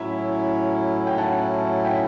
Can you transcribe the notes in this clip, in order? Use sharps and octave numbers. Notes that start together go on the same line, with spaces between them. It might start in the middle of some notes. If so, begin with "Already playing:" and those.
Already playing: A2 F#3 C#4 E4 E5
G5
F#5 A5
G5 B5